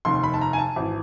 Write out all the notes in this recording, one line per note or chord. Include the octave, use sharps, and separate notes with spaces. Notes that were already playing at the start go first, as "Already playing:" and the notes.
F1 D#2 D#3 C6
B5
A5
A#5
G#5
A5
G#1 E3